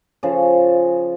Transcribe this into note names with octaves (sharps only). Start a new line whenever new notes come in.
C#3 F3 A4